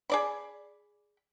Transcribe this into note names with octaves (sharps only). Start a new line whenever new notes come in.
G#4 D5 B5